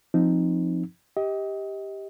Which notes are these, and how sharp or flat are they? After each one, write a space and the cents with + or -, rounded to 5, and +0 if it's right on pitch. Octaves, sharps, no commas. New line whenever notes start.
F3 +0 C4 +0 D#4 +0
G4 +0 D#5 +30